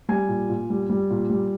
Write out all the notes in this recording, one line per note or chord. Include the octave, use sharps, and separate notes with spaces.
G3 G#5
A#2
A#2
G3
G3
A#2
G3